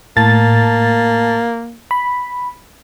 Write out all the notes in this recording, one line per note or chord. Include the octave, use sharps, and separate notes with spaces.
A2 A#3 A5 A6
B5